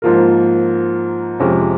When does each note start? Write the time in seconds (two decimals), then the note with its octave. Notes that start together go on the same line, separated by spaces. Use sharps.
0.02 G#2 F3 A#3 F4 A#4
1.40 F2 C3 F3 G#3 C#4